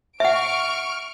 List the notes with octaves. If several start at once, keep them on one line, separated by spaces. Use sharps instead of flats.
E5 F#5 C#6 F6 D7